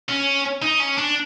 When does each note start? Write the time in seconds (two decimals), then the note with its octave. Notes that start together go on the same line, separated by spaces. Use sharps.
0.09 C#4
0.62 D#4
0.80 C#4
0.98 D4